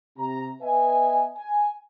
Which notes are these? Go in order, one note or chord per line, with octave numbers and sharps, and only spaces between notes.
C3 A#5
B3 B4 D#5 E5 G#5
G#5